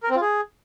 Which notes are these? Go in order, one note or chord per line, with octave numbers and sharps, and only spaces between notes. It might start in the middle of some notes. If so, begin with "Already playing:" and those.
A#4
C4
F4
G#4